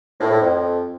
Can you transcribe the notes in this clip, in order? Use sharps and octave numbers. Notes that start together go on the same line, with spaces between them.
A2
A2
F2